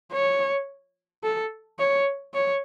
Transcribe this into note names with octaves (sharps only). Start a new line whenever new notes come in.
C#5
A4
C#5
C#5